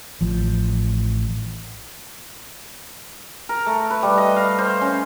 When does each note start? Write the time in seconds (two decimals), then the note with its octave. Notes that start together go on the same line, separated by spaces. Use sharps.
0.21 A1 F3
3.49 A#4
3.66 A3
3.90 B4
4.03 G3
4.18 D#5
4.36 F5
4.59 C5
4.81 C#4